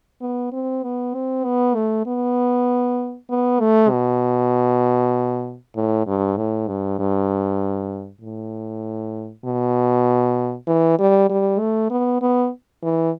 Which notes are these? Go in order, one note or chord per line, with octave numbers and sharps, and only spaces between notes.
B3
C4
B3
C4
B3
A3
B3
B3
A3
B2
A2
G2
A2
G2
G2
A2
B2
E3
G3
G3
A3
B3
B3
E3